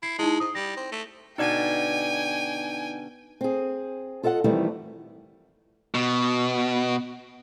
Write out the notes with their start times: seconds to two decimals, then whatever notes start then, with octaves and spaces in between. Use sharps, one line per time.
0.03 E4 C7
0.19 G#3 D#4 E4
0.40 G#2 D#6
0.55 G3 A#6
0.77 C4
0.92 A3
1.38 B2 D3 D#4 D5 G5 G#5 G#6
3.41 C4 G#4
4.23 F4 A4 D#5 E5 F#5
4.44 F2 D#3 E3 G3 A3 E4
5.95 B2